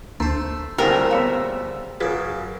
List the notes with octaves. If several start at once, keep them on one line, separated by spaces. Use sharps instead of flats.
D2 A3 A#3 C5 C6
D2 A#2 G3 A3 C4 E4 G#4 A#4
B3 C#5 E5 F5
F#2 C#3 F4 G#4 B4 D6